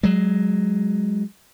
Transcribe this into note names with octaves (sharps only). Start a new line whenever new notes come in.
F#3 G#3